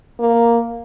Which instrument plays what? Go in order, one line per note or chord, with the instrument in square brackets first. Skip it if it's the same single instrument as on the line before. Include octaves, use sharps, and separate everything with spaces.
[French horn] A#3